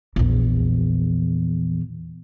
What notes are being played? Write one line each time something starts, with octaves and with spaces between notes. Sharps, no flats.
A#1 E2